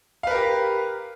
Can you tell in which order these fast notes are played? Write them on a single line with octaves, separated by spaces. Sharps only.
F5 B4 A#4 G4